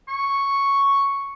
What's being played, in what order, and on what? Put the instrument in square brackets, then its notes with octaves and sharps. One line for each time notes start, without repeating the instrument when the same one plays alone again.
[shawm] C#6